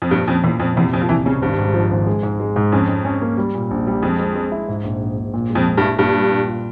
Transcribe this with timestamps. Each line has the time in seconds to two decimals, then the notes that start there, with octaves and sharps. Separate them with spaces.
0.02 F2
0.11 G2 A#2
0.27 F2 C#4
0.44 E2 A#2
0.60 F2 A#2
0.76 E2 C3
0.92 F2 C3
1.02 F3
1.09 C2 E3
1.25 C#3 C#4
1.41 G#1 G2
1.58 G#2
1.74 F3
1.91 G#1
2.07 G#3
2.23 G#2
2.40 G#3
2.56 G#2
2.72 F2 C#4
2.88 C#4
3.05 C#4
3.22 A#3
3.38 G3
3.55 A#2
3.71 A#1
3.87 G3
4.02 F2 G#3
4.19 G#3
4.36 G#3
4.52 E4
4.68 G#2
4.84 A#1
5.01 A#1
5.17 A#1
5.34 A#2
5.50 G#3
5.55 F2
5.66 G#3
5.77 G2
5.82 E4
5.99 G2 A#2
6.15 G3
6.32 A#2
6.48 F4